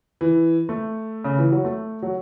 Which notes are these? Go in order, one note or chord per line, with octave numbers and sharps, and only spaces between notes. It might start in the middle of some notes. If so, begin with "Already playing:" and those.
E3
A3
C#3
E3
F#3
A3
F#3